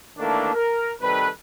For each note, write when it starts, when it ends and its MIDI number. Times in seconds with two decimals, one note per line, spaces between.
0.18 0.53 51
0.18 0.53 52
0.18 0.53 57
0.18 0.53 58
0.18 0.53 62
0.54 0.93 70
1.01 1.27 48
1.01 1.27 51
1.01 1.27 55
1.01 1.27 69
1.01 1.27 71